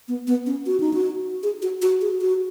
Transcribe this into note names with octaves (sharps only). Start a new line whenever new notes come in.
B3
B3
C#4
F#4
D#4
F#4
G#4
F#4
F#4
G#4
F#4